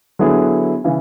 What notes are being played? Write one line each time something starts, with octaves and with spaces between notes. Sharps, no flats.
D3 F#3 B3 E4 G#4
C#3 E3